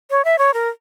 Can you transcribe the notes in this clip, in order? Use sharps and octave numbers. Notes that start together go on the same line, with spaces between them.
C#5
E5
C#5
A#4